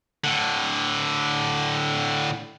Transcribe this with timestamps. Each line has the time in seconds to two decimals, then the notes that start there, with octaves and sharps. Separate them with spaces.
0.24 A2 D3